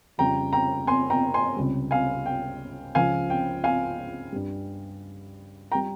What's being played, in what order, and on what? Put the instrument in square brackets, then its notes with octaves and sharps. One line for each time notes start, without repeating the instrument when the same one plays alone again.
[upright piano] F2 C#3 G3 G5 A#5
G5 A#5
G#5 C6
G5 A#5
G#5 C6
C#2 C3 G3
F5 G#5
G5
C#2 C#3 F3 F5 G#5
G5
F5 G#5
G2 G3
G5 A#5
G3